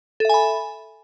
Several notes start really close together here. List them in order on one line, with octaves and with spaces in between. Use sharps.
A4 E5 G#5 B5